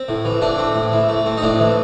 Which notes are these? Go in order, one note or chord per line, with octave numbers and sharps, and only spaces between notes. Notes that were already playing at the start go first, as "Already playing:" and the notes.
Already playing: C4
A2
E3
A3 D4
C4
A2
E3
A3
C4
D#4
A2 D4
E3